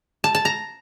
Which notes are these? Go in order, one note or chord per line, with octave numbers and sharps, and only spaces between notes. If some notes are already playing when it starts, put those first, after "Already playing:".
A5
A5
A#5